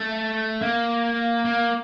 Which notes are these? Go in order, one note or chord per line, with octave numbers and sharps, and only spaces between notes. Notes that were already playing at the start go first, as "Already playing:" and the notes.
Already playing: A3
A#3
A#3